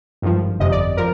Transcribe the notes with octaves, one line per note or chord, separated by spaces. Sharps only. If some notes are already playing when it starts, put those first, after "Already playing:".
G#1 G2 F3
G1 F2 C3 D#5
D5
F3 A#4